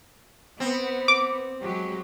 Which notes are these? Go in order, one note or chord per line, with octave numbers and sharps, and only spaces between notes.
B3 C4
D6
F#3 G#3 G4